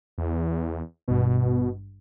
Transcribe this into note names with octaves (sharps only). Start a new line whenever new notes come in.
E2
G#1 G2 B2